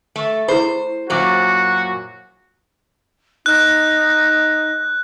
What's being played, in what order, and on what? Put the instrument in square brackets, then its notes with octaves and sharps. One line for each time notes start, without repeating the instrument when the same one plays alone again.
[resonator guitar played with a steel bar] A3
[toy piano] E4 G#4 B5 [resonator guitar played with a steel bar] C5
[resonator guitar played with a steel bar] F#2 A#2 F#3 [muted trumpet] F#4 [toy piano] C5 D6
[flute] D#4 [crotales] F#6